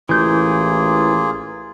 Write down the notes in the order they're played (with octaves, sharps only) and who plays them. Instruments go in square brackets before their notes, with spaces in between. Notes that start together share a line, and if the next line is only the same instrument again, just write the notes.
[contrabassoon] A1 [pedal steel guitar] E3 G6 [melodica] A#3 F4 G#4